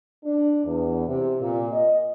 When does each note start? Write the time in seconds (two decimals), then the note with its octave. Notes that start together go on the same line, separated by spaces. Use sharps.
0.25 D4
0.65 E2
1.07 C3
1.41 A#2
1.73 D#5